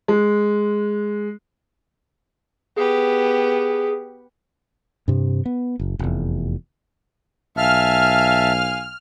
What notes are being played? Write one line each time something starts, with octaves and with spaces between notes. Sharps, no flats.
G#3
B3 G4 G#4
G2 C3
B3
F#1
F1 E2
B1 E5 F5 G#5 A5 F6